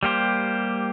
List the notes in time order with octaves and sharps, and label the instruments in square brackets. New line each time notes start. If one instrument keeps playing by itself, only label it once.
[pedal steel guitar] G3 A#3 G4 C5